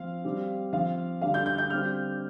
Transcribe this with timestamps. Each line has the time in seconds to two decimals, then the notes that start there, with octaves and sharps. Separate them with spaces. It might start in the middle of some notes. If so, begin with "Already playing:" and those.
Already playing: F3 C4 F5
0.24 C3 G3 C4
0.73 F3 C4 F5
1.21 D3 G3 D4 F5
1.34 G6
1.46 G6
1.58 G6
1.70 D3 G3 C4 F6